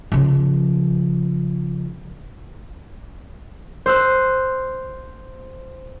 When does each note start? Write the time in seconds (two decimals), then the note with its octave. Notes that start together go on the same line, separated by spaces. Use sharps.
0.12 C#3 F3
3.86 C5 E6 F#6